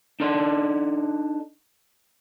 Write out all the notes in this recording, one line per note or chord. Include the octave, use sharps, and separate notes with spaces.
D4 D#4 A4 D5 C6